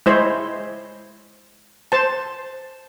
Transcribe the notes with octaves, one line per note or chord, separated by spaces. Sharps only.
G#3 E4 C5 C#5
C5 A5